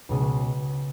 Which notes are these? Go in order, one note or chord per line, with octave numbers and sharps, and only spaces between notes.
C#2 B2 G#3 C#4 G#4